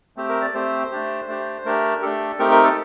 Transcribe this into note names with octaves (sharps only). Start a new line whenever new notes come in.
A3 C4 G4
A#4
D5
A3 C4 G4 C5
A3 D4 G4
A3 D4 G4
A3 D4 G4 A#4
A3 D4 G4 A4
A3 C4 D#4 G4 A#4
A#4
A4